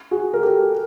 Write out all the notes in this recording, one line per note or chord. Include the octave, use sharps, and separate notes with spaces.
F#4 G#4
A#4
G4 A4